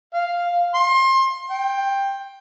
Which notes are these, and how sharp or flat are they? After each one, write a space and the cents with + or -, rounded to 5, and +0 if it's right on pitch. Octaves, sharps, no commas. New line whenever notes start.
F5 +0
C6 +30
G5 +10